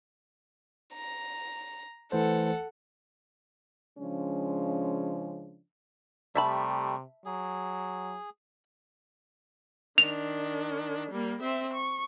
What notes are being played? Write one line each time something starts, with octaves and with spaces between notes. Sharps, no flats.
A#5
E3 A3 A4 C5 F#5
C#3 F3 G#3 C#4 D4
C3 G3 A3 E5 A5 B5
F#3 G#4
D#3 D4 F7
G3 A#3
C4 E5
C#6